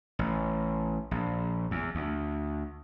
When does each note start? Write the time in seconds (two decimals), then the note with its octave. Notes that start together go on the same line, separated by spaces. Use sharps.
0.19 A1
1.11 A#1
1.71 E2
1.95 D2